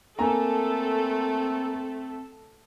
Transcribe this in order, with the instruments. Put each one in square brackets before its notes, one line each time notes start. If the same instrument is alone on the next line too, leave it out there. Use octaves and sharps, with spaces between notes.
[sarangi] A3 [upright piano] A#3 G#5 A#5 [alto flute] C4 [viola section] A4